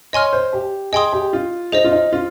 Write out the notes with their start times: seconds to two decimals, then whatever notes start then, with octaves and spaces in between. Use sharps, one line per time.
0.13 C#5 D#5 G#5 C6 F6
0.33 C5
0.53 G4
0.92 G#4 D#5 G5 C6 D#6
1.12 G4
1.33 F4
1.72 D#4 G#4 C5 D#5
1.84 F4
1.92 D#4
2.12 F4